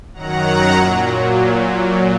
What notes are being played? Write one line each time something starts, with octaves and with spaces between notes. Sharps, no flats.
F#2 D#3 F#3 F#5 A#5
A#2 F#3